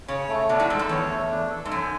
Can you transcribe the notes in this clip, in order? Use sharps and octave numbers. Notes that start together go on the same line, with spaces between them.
C#3 C#5
A3
B2 D4
A2
G#2 A4
F#2
E2 C#5
A3
D4
A4
G#2
F#2 G#5